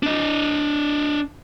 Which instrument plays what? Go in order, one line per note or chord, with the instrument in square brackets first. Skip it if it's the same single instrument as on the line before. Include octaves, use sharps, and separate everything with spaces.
[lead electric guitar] D4 D#5